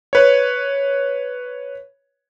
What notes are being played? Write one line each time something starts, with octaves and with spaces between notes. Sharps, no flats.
B4 C#5